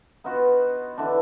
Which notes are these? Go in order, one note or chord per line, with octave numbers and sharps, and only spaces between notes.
B3 D#4 F4 F#4
D3 E3 D4